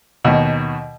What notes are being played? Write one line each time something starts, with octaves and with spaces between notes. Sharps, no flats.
D#2 B2